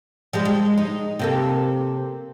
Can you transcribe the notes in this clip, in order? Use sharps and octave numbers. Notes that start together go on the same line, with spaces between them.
F3 G3 G#3
G#3
D#4
C3 A#3 A4